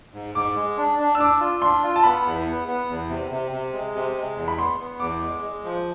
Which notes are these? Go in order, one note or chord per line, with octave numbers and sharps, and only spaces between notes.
G#2
G#2 D6
G#3
D4
D4
E6
D4 D6
F4
D4 C6
F4
A5
B3 B5
E2
B3
B3
E2
C3
C3
C3
G#3
C3
G#3
E2
B5
B3 C6
B3
E2 D6
G#3
G#3
F3